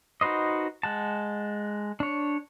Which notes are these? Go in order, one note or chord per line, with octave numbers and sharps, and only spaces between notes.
D#4 F#4 B4 C5 D#5
G#3 F#5 A5
D4 C#5